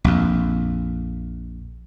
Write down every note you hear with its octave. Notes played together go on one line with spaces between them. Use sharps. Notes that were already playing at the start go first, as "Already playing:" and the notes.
A#1 F2